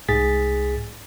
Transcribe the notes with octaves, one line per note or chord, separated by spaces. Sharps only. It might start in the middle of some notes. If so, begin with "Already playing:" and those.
C2 G#2 G#4 A6 B6